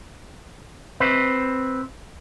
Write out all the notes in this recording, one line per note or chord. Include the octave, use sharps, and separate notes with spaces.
C4 B4